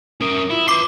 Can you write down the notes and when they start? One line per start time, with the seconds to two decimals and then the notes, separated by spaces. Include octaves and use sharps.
0.21 C#4 A#4 D#6
0.50 E4 F4
0.68 B4 C6 D6 C7